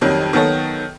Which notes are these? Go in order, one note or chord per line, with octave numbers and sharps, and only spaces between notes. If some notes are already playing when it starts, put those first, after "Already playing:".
F2 D#3 F#3 G3
D#3 F#3 B3 A4 C#5